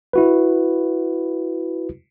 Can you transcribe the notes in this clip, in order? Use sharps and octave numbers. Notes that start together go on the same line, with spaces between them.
E4 F#4 B4